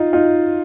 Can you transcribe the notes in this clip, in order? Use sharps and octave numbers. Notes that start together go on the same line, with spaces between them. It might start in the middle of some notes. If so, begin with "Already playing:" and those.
Already playing: D#4 F4
D#4 F4